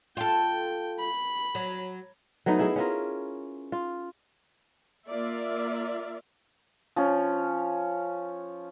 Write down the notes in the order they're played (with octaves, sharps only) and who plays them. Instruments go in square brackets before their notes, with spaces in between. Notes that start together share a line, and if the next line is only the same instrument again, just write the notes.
[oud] F4 A4 [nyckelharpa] G5
[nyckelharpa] B5
[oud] F#3
[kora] F#3 A3 B3 D#4
E4 G#4 D#5
C#4 E4 F4 A#4
F4
[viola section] A#3 F4 A#4 D5 E5
[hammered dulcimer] F3 C#4